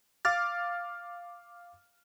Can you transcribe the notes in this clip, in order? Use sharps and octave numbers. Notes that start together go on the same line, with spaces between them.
F5 D6 F6 A6